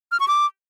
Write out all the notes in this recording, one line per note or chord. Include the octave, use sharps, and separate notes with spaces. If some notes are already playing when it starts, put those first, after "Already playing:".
F6
C#6
D6